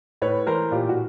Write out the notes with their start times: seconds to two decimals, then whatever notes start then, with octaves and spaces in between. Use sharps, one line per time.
0.22 A2 B4 C#5
0.47 E3 A#4 C5
0.71 A#2 F4 G4
0.89 F#4